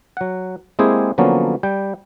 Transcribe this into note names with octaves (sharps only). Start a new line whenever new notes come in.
F#3 F#5
G#3 A#3 C4 E4 G4 G#4
D3 F3 F#3 A#3 B3 C#4
G3 G5